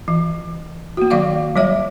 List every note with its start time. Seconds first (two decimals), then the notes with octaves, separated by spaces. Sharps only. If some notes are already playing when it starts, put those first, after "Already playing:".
0.08 E3
0.97 A#3 F#4
1.10 D#3 F#3 A#3 D5 F5 D6
1.56 F#3 G3 C#5 E5